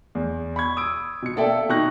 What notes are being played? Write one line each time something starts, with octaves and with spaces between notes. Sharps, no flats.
E2
B5 C#6 G#6
D#6 E6 D7
B2 C#7
A#3 A4 D5 E5 G5
B2 D#4 C#6 F#6 A#6